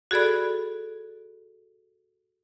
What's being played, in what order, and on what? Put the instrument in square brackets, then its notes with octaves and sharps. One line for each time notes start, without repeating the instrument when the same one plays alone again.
[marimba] F#4 G#4 A4 D5 B5